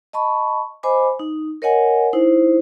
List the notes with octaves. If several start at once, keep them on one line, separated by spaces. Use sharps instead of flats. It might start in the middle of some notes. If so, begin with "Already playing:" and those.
D#5 A5 B5 C#6
C5 D#5 G#5 B5 D6
D#4
A#4 C#5 D#5 F#5 G#5
D#4 E4 C5